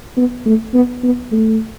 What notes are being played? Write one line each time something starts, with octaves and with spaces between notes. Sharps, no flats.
B3
A3
B3
B3
A3